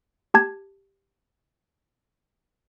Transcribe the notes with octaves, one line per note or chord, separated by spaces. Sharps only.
G4 A5 G#6